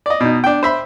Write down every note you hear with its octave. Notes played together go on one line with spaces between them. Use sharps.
D5 D#5
B2 D#4
D4 G5
C5 E5 B5